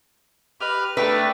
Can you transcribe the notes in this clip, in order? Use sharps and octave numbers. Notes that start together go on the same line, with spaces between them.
G4 B4 D#5 F6
A3 D4 B4 E5 G5 A#5